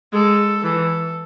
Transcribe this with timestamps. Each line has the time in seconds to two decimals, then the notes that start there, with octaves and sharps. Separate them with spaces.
0.13 G#3 A4
0.63 E3 A4